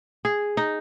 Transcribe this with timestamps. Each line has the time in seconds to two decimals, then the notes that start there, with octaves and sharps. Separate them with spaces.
0.25 G#4
0.57 D#4